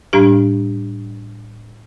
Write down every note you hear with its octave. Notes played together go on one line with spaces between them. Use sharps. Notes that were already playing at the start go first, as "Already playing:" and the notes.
A2 G3 D4 G4